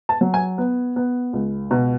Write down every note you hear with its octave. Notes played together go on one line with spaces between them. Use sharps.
A5
F#3
G#5
B3
B3
C#2
B2